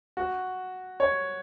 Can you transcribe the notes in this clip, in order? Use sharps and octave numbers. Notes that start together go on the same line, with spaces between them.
F#4
C#5